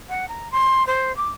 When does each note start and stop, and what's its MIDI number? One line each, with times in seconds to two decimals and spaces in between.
0.09 0.28 78
0.28 0.49 82
0.52 0.85 84
0.87 1.15 72
1.17 1.28 86